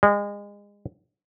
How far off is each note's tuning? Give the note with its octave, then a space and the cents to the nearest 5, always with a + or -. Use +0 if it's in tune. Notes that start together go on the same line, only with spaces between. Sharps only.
G#3 -30